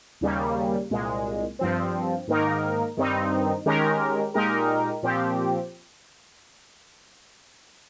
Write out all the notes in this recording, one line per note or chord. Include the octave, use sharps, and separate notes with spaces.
D#2 C#3 G3 A#3
C2 A#2 G#3
G2 F3 C4
G#2 D#3 A#3 D#4 A#4
G2 D#3 G3 C4 D#4
D#3 G#3 C#4 G4 A#4
A#2 G#3 D#4 G4 A#4
A#2 F3 C4 G4